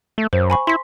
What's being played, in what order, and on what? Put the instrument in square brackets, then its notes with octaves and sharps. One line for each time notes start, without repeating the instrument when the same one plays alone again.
[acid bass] A3
[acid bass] F#2 [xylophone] C5
[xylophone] G#5 B5 C#6
[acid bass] E4 [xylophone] C6 B6